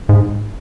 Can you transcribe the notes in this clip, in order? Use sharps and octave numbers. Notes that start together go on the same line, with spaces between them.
G#2